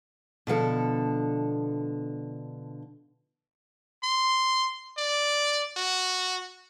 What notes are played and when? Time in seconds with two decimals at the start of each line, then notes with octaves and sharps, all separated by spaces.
0.47 B2 D3 F3 A4
4.03 C6
4.98 D5
5.77 F#4